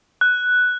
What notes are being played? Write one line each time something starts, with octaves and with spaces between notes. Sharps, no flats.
F#6